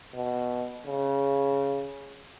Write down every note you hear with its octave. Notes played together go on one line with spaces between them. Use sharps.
B2
C#3